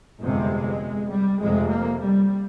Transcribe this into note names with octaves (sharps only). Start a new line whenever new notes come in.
G1 F2 C3 G#3
G3
F1 F2 C3 G#3
A#3
G3